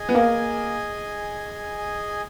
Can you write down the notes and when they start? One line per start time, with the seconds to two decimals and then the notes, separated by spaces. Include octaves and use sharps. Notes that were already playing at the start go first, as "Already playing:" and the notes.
Already playing: G#4 D#5 G#5
0.09 B3
0.15 A#3